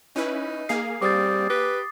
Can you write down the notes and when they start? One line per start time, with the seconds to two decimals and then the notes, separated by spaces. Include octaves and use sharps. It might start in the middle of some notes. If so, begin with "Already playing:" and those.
0.16 C#4 D#4 E4 B4
0.69 A#3 G#4 F5 C7
1.02 G3 C4 D6 D#6 A6
1.50 G4 B4